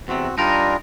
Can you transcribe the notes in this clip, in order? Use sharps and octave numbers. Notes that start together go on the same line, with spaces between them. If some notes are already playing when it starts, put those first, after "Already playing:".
E2 C3 C4 F#4
G3 D4 D#4 F4 A#4